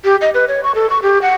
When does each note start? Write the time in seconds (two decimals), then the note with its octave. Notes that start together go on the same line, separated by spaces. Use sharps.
0.04 G4
0.21 D#5
0.34 B4
0.48 C#5
0.64 C#6
0.75 A4
0.90 C#6
1.02 G4
1.22 F#5